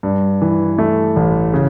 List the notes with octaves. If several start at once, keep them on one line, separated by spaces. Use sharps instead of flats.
G2
E3
A3
A1
C#3